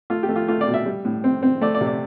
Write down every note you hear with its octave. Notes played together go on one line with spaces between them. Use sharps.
A3 F4
G4
A3
F4
A3 F4
D5
B2
E5
G3
A2
C4
C4
A3 D5
D5
C3
D5